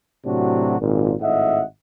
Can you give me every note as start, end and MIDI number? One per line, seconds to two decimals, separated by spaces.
0.25 0.79 45
0.25 0.79 48
0.25 0.79 54
0.25 0.79 62
0.25 0.79 66
0.80 1.14 32
0.80 1.14 46
1.21 1.62 32
1.21 1.62 45
1.21 1.62 75
1.21 1.62 76
1.21 1.62 78